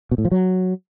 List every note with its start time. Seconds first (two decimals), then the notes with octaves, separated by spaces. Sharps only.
0.11 B2
0.18 A2
0.25 F3
0.32 F#3